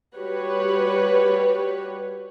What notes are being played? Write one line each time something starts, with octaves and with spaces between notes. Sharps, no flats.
G3 F#4 G4 B4 C#5